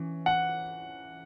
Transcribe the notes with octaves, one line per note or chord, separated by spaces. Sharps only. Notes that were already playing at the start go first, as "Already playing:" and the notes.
Already playing: E3 C#4
F#5